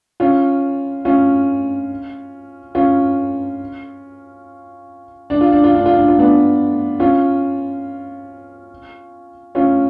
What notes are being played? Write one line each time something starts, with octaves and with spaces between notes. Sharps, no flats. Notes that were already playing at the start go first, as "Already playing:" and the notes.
C#4 F4
C#4 F4
C#4 F4
D4
F4
D4
F4
D4
F4
D4
F4
B3 D4
C#4 F4
C#4 F4